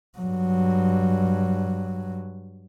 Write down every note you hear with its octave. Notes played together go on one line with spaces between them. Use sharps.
G2 F#3